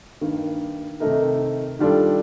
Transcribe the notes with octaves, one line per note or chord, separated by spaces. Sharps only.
G2 D#3 A#3
C3 D#3 A3 D#4 A#4
D#3 G3 D4 F4 A4